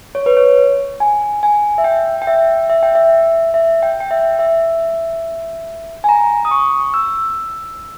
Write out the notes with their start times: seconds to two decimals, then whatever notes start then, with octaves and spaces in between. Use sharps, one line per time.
0.15 C#5
0.26 B4
0.37 C#5
1.00 G#5
1.43 G#5
1.78 E5
1.84 G5
2.22 G5
2.27 E5
2.70 E5
2.83 G5
2.95 E5
3.54 E5
3.83 G5
4.00 G5
4.11 E5
4.39 E5
6.04 G#5
6.09 A#5
6.45 D#6
6.51 C#6
6.94 E6